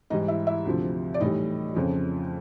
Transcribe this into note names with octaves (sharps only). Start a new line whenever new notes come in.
G#2 E3 G3 D#4 D#5
E4 E5
E4 E5
D2 C3 F3
D5
A2 E3 G3 D#4 D#5
F2 C#3 F3